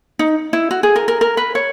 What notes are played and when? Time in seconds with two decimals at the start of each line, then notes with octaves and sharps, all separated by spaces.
0.19 D#4
0.53 E4
0.71 F#4
0.83 G#4
0.96 A#4
1.08 A#4
1.21 A#4
1.37 B4
1.55 C#5